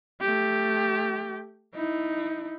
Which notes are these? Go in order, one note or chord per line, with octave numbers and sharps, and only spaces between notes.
A3 G4
D#4 E4